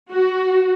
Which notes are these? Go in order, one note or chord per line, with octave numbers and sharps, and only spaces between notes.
F#4